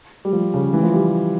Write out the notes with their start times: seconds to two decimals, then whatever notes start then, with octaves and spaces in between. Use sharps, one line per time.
0.25 G3
0.33 F3
0.54 C#3
0.73 E3
0.83 F3
0.93 G3